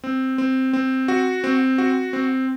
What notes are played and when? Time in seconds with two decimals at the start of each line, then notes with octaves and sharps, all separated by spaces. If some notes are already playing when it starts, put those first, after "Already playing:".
0.04 C4
0.38 C4
0.73 C4
1.08 F#4
1.44 C4
1.78 F#4
2.13 C4